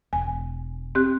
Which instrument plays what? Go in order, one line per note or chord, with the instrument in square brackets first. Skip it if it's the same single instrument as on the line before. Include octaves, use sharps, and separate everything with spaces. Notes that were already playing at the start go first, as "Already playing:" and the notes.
[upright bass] E1 [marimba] G#5
[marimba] C4 G4 F#6